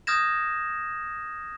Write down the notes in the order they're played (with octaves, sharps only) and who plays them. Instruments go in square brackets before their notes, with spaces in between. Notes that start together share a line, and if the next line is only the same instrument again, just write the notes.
[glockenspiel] D#6 F6 G6 G#6 A#6 E7